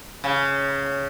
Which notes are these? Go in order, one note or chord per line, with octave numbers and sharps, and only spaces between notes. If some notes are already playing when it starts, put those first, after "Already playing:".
C#3